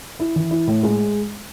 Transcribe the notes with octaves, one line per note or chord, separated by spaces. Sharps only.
E4
E3
E4
A2
G#3